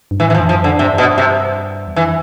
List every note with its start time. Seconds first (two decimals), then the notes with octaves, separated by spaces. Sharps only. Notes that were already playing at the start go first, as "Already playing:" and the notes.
0.11 G2
0.20 A2 E3
0.30 E3
0.35 F3
0.39 F2
0.49 F3
0.53 G2
0.59 F2 D3
0.79 G2 C3
0.98 B2
1.18 C3
1.87 E2
1.96 F2 E3